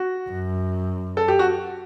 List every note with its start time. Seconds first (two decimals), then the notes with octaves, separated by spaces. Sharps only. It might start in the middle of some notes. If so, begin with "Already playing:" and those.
Already playing: F#4
0.30 F#2
1.17 A4
1.28 G4
1.39 F#4